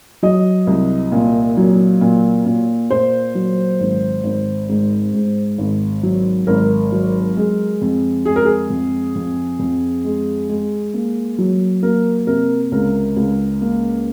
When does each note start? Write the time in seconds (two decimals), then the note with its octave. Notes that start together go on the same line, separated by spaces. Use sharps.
0.23 F#3 D#5
0.67 C2
1.12 A#2
1.57 F#3
2.01 A#2
2.45 A#2
2.90 A#2 C5
3.35 F#3
3.80 G#1
4.24 G#1
4.69 G#2
5.14 G#2
5.58 G#1
6.03 F#3
6.47 G#1 A#4
6.92 F#3
7.37 G#3
7.82 F2
8.25 G#3 G#4
8.36 A#4
8.45 G#4
8.70 F2
9.15 F2
9.59 F2
10.05 G#3
10.49 G#3
10.94 A#3
11.38 F#3
11.83 A#3 A#4
12.27 C3 A#4
12.72 C#2 A#4
13.17 C#2
13.61 A#3